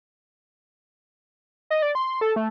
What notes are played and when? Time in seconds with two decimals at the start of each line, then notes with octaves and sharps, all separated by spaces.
1.70 D#5
1.82 D5
1.95 C6
2.21 A4
2.36 A3